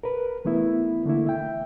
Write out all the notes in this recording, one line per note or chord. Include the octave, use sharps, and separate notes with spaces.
A#4 B4
E3 A3 B3 E4
D3 A3 A#3 E4
E5 G5